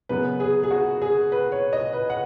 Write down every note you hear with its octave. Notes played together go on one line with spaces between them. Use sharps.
F#2 C#3 B3 B4
G#4
G#4
F#4
G#4
B4
C#5
D#5
B4
F#5